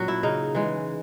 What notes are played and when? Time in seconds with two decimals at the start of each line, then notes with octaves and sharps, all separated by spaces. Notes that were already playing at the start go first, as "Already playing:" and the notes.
Already playing: A#2 F#3 C#4 F#4
0.08 E4
0.23 C#3 D#4
0.55 E3 G#3